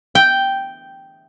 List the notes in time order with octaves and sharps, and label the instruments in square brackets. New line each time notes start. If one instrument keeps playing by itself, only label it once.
[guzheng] G5